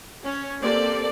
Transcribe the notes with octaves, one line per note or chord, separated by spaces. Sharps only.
C#4 C#5
A#3 C4 G4 A4 D5